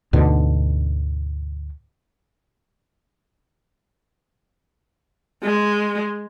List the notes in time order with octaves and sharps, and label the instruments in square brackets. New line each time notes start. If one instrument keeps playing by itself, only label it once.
[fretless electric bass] D2 G#2 B2 D3
[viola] G#3